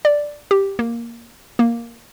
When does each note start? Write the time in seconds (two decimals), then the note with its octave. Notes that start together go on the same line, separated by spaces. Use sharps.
0.05 D5
0.51 G4
0.79 A#3
1.59 A#3